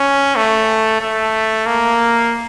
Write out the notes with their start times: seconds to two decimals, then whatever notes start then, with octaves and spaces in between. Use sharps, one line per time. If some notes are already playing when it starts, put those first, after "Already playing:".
Already playing: C#4
0.36 A3
1.01 A3
1.66 A#3